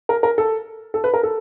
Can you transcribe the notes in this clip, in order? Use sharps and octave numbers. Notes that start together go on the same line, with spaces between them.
A#4
A#4
A4
A4
B4
A#4
A4